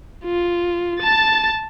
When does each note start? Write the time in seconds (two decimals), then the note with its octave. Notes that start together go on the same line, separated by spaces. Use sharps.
0.25 F4
0.99 A5 A6